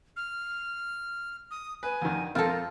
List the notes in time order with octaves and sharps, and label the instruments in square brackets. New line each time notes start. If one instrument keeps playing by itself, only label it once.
[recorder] F6
D#6
[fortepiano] B4 [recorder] G#5
[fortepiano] F2 D3 D#3
[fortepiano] F2 C4 [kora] F4 A4 [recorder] A#4